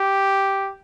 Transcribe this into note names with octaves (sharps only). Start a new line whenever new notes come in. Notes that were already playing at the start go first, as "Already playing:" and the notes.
Already playing: G4